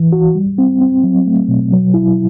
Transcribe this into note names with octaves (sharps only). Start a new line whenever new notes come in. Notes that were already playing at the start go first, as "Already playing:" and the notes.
Already playing: E3
F#4
G3
C4
C4
F#3
A3
B2
F#3
E4